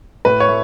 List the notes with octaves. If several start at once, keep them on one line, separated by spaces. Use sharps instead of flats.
A2 B4
C#5
A3